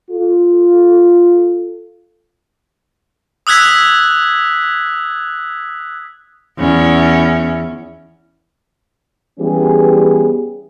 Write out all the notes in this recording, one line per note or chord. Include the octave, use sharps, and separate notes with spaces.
F4 A4
D#6 E6 F#6 G#6 B6
E2 C#4
E3 G3 B3 C#4 G4 G#4